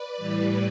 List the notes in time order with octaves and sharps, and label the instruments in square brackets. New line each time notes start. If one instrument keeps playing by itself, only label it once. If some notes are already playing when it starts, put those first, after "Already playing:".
Already playing: [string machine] B4 D5
A2 E3 G3